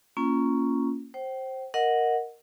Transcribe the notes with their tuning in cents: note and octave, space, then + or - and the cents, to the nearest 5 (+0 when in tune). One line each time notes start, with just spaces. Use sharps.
A#3 +0 C#4 +0 F4 -20
C5 +15 G5 -35
A#4 +0 D#5 +0 F#5 -10